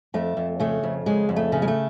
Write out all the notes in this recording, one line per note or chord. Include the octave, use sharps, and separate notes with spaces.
F2 A3
F2
C#3 A3
F2
C#3 G#3
F2
A3
C#3
G#3
A3